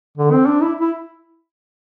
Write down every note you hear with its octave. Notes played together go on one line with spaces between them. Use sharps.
D3
C4
D4
E4
E4